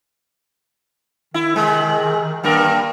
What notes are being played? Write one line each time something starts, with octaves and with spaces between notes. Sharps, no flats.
D#3 E4
C3 G#3
G2 A#3 A#4